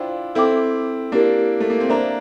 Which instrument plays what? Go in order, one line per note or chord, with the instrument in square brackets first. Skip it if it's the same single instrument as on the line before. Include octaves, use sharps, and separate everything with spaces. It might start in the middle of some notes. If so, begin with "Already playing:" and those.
Already playing: [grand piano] D4 E4 F4 [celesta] C5 G5
[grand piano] C4 E4 [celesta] A4 E5 G5 D6
[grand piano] A#3 D4 [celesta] E4 G4 A#4
[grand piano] A3
A#3
C4
[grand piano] A#3 D4 [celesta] C5 E5 A#5